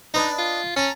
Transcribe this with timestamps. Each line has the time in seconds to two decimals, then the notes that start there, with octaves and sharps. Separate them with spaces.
0.14 D4 D#4 B4 D#5
0.38 F4
0.77 C#4 A5 A#5